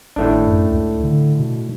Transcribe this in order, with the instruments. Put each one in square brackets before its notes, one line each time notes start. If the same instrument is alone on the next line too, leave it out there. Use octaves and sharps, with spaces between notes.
[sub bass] G#1 [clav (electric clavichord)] A2 A3 D4
[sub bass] F#2
C#2
D3
B2